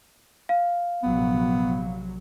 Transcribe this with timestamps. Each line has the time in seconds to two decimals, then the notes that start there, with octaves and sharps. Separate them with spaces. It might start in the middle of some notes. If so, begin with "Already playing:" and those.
0.49 F5
1.03 A#1 C3 F#3 B3